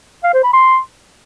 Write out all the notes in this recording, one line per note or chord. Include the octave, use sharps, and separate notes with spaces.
F5
C5
B5
C6